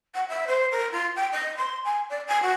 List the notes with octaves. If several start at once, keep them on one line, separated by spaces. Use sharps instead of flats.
F#5
E5
C5
A#4
F4
G5
D#5
C6
G#5
D5
G#5
F#4